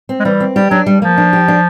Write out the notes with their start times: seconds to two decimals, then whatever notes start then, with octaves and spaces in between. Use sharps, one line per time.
0.09 C4
0.20 G#3
0.25 E3 G3
0.40 C4
0.56 G3 G4
0.70 F#3 D4
0.86 G3
1.02 F3 A#3
1.18 D4
1.33 G4
1.48 D4